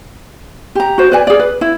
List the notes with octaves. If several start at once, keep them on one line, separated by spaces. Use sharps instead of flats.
G4 A#5
F#4 C5
B4 D5 G#5
G#4 D5
B4
E4